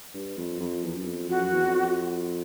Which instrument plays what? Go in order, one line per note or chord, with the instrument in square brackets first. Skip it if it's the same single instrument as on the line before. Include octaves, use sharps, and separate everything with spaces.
[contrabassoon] G2
F2
F2
E2
F#2
F2
[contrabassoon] F2 [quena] F#4
[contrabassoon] F#2
E2
F2